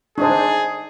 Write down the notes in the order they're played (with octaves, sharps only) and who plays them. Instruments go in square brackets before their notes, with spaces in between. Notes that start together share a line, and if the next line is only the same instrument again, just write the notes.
[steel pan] D4 D#4 C5 [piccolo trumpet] G#4